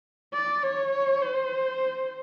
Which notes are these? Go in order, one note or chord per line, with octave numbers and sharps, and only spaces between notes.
D5
C#5
C5